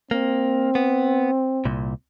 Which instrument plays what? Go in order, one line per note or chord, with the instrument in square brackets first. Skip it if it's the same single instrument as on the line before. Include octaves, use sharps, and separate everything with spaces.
[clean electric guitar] A#3 [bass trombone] C4
[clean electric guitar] B3
C2 A#2